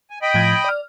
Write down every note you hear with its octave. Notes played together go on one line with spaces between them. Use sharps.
G#5
D#5 G5 B5
A2 F3 G#6
D5 F6